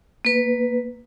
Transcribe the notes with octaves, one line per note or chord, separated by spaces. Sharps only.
A#3 B4